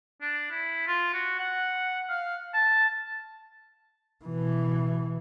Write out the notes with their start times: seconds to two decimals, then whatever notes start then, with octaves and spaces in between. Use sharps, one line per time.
0.21 D4
0.51 E4
0.87 F4
1.14 F#4
1.39 F#5
2.09 F5
2.54 A5
4.25 B2 E3